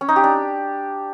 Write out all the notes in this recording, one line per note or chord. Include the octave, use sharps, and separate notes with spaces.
C#4
D#4
G4
D4